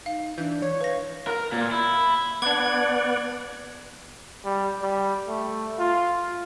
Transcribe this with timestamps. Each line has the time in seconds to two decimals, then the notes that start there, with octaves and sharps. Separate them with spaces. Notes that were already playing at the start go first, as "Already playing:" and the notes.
0.06 D#4 F5
0.38 E3 D4 G6
0.62 C#5
0.81 B4 F5 A#6
1.27 A#4
1.52 A#2
1.71 E4
2.42 B3 D4 D5 F#5 G#6
4.45 G3
4.82 G3
5.27 A3
5.79 F4